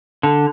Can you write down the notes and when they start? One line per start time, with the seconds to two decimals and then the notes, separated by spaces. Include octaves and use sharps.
0.23 D3